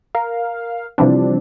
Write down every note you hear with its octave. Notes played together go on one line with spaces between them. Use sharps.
A#4 F5
C3 E3 F3 G3 C4 D4